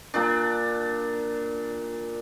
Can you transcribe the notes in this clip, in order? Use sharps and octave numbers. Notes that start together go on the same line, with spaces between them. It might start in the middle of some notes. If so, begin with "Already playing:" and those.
A#2 D4